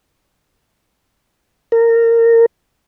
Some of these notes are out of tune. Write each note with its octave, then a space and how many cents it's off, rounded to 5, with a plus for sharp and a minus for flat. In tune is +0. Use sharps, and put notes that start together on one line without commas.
A#4 -20